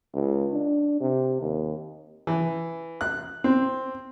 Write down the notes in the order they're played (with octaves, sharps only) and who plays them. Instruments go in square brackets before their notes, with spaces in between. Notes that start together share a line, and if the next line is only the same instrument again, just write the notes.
[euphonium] C#2
D4
C3
D#2
[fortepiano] E3
F#6
C4